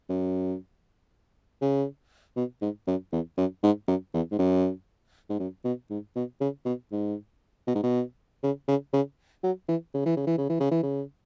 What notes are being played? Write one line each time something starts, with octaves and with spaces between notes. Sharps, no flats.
F#2
C#3
B2
G#2
F#2
E2
F#2
G#2
F#2
E2
G#2
F#2
G#2
F#2
B2
G#2
B2
C#3
B2
G#2
B2
G#2
B2
C#3
C#3
C#3
F#3
E3
C#3
E3
C#3
E3
C#3
E3
C#3
E3
C#3